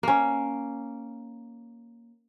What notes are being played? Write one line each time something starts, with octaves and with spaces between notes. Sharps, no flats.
A#3 C#4